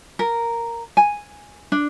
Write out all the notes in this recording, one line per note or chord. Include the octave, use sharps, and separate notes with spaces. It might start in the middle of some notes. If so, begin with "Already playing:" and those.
A#4
G#5
D4